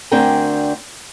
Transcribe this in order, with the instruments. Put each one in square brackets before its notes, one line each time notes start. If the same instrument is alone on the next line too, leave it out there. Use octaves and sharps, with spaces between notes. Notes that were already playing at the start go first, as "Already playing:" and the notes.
[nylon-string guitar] D2 C4 D4 A#4 G5 G#5